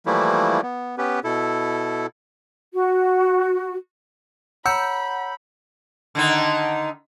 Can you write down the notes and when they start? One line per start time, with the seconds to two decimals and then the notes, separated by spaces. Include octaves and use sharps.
0.06 E3 F3 G3 A3 A#3 E4
0.63 B3
0.98 B3 C#4 G4 B4
1.24 B2 E4 A4
2.74 F#4
4.66 C#5 F#5 A#5 B5 E6 G6 C#7
6.15 D3 D#3 D#4